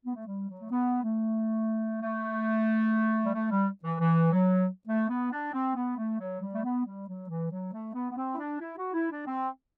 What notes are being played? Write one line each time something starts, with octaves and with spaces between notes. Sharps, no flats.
B3
A3
G3
F#3
A3
B3
A3
A3
G3
A3
G3
E3
E3
F#3
A3
B3
D4
C4
B3
A3
F#3
G3
A3
B3
G3
F#3
E3
F#3
A3
B3
B3
C4
E4
D4
E4
F#4
E4
D4
C4